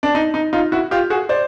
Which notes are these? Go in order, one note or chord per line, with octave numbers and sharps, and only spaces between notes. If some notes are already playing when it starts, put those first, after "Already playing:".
D4
D#4
D#4
D#4 F4
E4 F#4
F4 G4
F#4 G#4
C5 D5